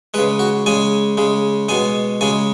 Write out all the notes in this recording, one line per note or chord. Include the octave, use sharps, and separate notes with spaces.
C#3 G#3 B4
F#4
C#3 G#3 G#5
C#3 G#3
B2 G#3 G#5
C#3 G#3 G#5